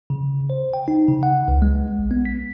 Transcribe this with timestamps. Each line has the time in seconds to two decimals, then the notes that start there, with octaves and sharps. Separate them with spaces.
0.10 C#3
0.50 C5
0.74 G5
0.88 D#4
1.08 C#3
1.23 F#5
1.48 C#2
1.62 G#3
1.99 A#1
2.11 B3
2.25 B6